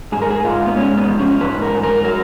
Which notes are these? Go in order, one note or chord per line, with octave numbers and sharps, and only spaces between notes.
G#2 G#4
A#4
G#4
G#2 F4
B3
G#3 C#4
B3
F3
C#4
G#2 B4
A#4
G#2
A#4
F#3 A#4